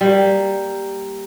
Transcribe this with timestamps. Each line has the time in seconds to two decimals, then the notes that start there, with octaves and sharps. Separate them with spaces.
0.01 G3 A#3